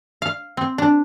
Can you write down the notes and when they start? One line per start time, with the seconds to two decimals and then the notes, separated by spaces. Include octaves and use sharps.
0.22 F5
0.57 C4
0.78 D4